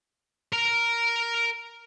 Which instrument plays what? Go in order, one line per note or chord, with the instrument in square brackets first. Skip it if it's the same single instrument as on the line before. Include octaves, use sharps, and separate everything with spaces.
[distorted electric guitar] A#4 A#5